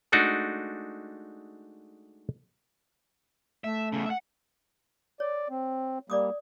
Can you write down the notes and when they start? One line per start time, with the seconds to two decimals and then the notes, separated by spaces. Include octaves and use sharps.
0.12 G#3 A3 D4 D#4 F#4
3.64 A3 E5
3.92 E2 C#3
4.06 E5 F#5
5.20 C#5 D5
5.50 C4
6.10 G3 A#3 D5 D6 D#6